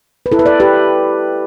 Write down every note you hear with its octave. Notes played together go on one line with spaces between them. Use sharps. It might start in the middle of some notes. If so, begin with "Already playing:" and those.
B4
E4 A4
B4
A4 D5
G4 B4